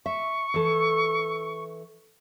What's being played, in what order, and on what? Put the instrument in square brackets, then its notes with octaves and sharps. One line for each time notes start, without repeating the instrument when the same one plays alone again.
[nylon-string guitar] E5 [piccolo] C#6
[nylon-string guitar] E3 A4